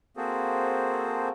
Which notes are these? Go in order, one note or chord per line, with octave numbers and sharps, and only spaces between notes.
A#3 C4 F#4 G#4 A4 C5